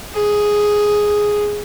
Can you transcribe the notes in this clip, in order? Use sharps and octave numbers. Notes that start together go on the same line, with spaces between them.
G#4